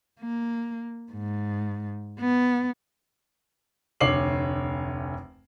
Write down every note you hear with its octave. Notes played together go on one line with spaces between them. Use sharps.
A#3
G#2
B3
F1 D2 C#5 D6 C7 F#7